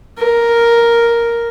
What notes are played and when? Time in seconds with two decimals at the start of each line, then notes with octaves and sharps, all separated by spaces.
0.18 A#4